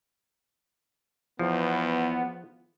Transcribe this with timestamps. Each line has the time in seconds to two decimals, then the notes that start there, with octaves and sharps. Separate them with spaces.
1.39 E2 F3 B3